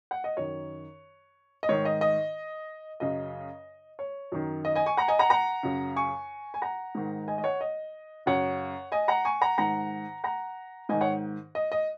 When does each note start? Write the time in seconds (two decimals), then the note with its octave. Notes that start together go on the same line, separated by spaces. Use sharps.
0.11 F#5
0.24 D#5
0.37 F#2 D#3 C#5
1.63 D#5
1.69 G#2 D#3 C#5
1.85 D#5
2.01 D#5
3.00 F#2 C#3 D#5
3.99 C#5
4.32 F#2 D#3
4.65 D#5
4.75 D#5 G#5
4.86 G#5 C#6
4.97 F#5 A#5
5.08 D#5 G#5
5.19 F#5 A#5
5.30 F#5 A#5
5.63 F#2 C#3
5.96 G#5 C#6
6.54 G#5
6.62 F#5 A#5
6.95 G#2 D#3
7.28 D#5 G#5
7.38 D#5
7.44 C#5 F#5
7.61 D#5
8.26 F#2 C#3 C#5 F#5
8.92 D#5 G#5
9.08 F#5 A#5
9.25 G#5 C#6
9.41 F#5 A#5
9.58 G#2 D#3 F#5 A#5
10.24 F#5 A#5
10.89 G#2 D#3 D#5 G#5
11.01 C#5 F#5
11.55 D#5
11.72 D#5